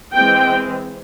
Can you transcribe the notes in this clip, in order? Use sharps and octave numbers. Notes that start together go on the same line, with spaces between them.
E3 G#3 C4 G5